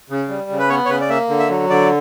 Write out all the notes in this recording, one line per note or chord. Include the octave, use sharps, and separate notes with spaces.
C#3
G3
C#3
B4
B3 C#5
C#5
C#3 B4
D5
A#3 E5
D3
E5
F#3
D3 D5